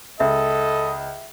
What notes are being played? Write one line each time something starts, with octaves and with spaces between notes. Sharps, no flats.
C#2 A4 D#5 E5